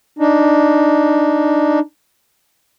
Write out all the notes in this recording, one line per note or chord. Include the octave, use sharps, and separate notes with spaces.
D4 D#4